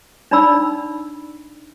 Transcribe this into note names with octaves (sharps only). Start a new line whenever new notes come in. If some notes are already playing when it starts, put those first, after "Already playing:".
D4 D#4 D5 B5 E6